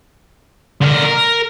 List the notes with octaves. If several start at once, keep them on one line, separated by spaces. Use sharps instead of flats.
D3 A#4
A#4